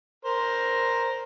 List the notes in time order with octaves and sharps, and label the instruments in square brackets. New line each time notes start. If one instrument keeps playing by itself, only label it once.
[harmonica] A#4 C5